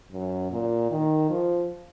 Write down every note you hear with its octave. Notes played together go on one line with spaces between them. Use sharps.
F#2
A#2
D#3
F3